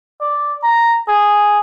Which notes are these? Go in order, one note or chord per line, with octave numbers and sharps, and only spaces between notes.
D5
A#5
G#4